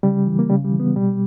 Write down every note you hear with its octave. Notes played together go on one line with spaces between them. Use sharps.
C#3 G3
E3
A#3
C#3 G3
G3
E3
B3
B2 G3